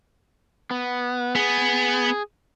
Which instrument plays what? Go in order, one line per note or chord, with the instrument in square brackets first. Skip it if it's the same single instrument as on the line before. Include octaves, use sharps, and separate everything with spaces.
[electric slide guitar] B3
[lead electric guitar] B3 [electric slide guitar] G#4